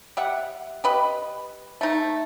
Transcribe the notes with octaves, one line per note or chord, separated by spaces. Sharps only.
G4 E5 F#5
G4 B4 D#5
A3 D#4